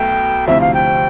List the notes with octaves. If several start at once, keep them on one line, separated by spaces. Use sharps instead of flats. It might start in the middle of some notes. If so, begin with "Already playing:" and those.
Already playing: B1 B2 A3 G5
D2 C3 F3 C4 E4 E5
F5
G5